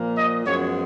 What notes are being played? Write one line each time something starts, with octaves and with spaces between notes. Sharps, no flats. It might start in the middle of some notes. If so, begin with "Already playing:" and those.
Already playing: A#2 F3 A#3
D#5
F#2 F3 G#3 B3 C#5